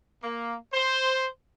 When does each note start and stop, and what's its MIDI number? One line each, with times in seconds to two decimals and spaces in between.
0.23 0.54 58
0.74 1.27 72